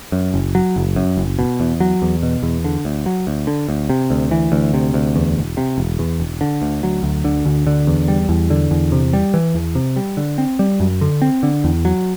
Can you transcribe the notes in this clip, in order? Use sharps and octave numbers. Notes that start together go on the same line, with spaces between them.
F#2
F#1
F#3
F#1
F#2
F#1
B2
E2
F#3
E2
B2
E2
D3
D2
F#3
D2
D3
D2
C3
D2
E3
D2
C3
D2
E2
E1
C3
E1
E2
E1
D3
D2
F#3
D2
D3
D2
D3
E2
G3
E2
D3
E2
C3
G3
E3
E2
C3
G3
D3
C4
G3
F#2
D3
C4
D3
E2
F#3